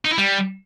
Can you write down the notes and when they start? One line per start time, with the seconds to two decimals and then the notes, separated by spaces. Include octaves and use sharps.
0.05 D#4
0.11 E4
0.18 G3